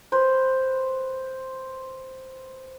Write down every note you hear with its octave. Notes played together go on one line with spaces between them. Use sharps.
B4 C5